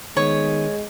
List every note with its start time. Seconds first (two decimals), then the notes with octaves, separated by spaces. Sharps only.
0.17 D#3 G#3 B3 C#5